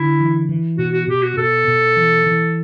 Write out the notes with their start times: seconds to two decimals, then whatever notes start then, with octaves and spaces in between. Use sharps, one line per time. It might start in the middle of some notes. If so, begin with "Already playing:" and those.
Already playing: D3 E4
0.20 E3
0.49 E3
0.78 B2 F#4
0.93 F#4
1.07 B2 G4
1.22 F#4
1.37 B2 A4
1.67 B2
1.97 E3
2.26 E3